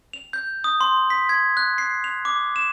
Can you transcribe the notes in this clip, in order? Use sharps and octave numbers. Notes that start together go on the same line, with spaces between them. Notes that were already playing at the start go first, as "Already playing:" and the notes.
F7
G6
D#6
C6
B6
G#6
F#6
C7
F7
D6
E7